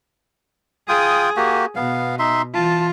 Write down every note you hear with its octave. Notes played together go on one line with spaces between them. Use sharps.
F4 G#4 G5 D#6
A#3 F#4 G4
B2 B3 F5
D#4 E5 C6
E3 F4 A5